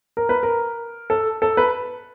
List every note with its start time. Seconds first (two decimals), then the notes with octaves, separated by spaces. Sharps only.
0.17 A#4
0.29 B4
0.43 A#4
1.10 A4
1.42 A4
1.57 B4